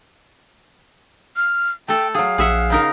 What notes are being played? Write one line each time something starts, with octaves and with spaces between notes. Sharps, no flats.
F6
A3 A4 G5
F#3 G#4 F5
A#1 G#4 E5 F#5
C#3 D#4 A#4